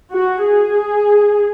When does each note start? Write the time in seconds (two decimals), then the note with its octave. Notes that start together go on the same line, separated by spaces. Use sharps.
0.10 F#4
0.43 G#4